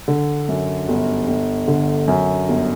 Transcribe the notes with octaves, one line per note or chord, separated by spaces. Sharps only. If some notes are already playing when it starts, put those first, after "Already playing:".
D3
F#2
G1
G1
D3
F#2
G1